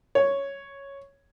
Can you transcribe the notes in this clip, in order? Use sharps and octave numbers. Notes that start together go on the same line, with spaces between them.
C#5